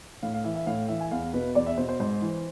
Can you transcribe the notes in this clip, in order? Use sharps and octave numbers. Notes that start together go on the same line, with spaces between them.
A2 F5
F5
E3 E5
E5
A2 F5
E3 E5
G#5
E2 F5
B2 B4
E2 D5
E5
B2 C5
C5
G#2 C5
E3